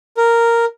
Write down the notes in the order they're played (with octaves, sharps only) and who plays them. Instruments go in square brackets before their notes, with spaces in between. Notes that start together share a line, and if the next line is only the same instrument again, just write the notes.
[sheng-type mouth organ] A#4